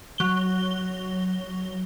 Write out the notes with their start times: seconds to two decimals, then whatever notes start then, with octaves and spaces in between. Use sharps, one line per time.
0.18 F#3 G7